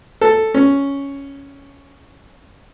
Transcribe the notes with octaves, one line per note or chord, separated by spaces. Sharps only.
A4
C#4